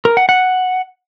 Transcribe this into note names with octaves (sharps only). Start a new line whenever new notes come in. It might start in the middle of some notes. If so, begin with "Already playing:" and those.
A#4
F#5
F#5